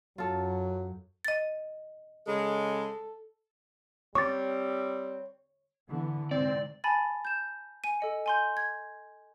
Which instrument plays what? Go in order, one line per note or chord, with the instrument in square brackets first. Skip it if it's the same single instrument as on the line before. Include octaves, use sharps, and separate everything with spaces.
[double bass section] F#2 [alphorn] F#3 [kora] F4 A4
[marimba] D#5 A6
[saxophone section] C#3 G#3 [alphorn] A4
[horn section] G3 C4 [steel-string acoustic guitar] C#5 [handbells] C#6 D6 A6
[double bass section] D3 E3 B3
[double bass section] G#2 C3 [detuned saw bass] C4 [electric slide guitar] D5
[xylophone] G#5 A5 B5 A6
G6 E7
G#5 D#7
A4 D#5 C#7
G#5 C6 G6
G#6